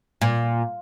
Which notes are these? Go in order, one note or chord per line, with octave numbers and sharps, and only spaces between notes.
A#2